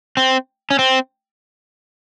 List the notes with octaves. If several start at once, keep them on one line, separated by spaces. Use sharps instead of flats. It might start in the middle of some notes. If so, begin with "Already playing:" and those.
C4
C#4
C4